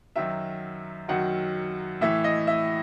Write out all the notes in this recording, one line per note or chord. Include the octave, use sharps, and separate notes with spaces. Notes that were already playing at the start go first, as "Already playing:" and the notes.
F#2 D#3 F#3 E5
F#2 D#3 F#3 F#5
A2 E3 E5
D#5
E5